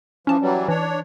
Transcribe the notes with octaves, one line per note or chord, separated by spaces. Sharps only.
E3 F3 C#4 A5
E3 F#3 G3
E3 D4 C#5